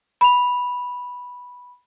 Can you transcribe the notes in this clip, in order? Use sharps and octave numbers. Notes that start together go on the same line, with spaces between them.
B5 F7